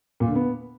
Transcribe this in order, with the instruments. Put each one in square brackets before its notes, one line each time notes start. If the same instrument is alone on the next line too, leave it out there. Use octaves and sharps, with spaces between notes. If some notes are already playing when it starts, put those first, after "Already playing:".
[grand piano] A#2
D3
B3